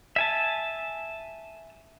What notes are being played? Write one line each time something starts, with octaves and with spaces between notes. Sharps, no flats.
E5 G#5 A5